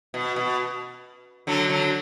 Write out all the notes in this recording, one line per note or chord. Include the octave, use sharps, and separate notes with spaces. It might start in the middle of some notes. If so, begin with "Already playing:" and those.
B2
B2
D3 F#3
D3 F#3